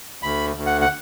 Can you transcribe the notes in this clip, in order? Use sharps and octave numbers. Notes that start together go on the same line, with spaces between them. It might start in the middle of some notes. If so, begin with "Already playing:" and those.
D2 B5
D2
F#5
F#5